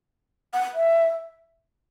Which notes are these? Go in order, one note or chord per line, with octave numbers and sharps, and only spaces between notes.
F#5
E5